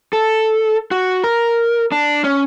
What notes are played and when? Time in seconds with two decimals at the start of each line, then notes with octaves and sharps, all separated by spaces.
0.13 A4
0.91 F#4
1.24 A#4
1.92 D4
2.24 C#4